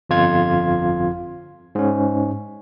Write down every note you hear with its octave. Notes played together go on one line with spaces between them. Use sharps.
G1 F2 F4 G#6
G#2 C#4